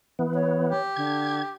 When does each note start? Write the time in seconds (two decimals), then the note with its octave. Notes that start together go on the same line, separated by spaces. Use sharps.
0.19 E3 B3
0.34 C#5
0.67 G4
0.96 D3 G#6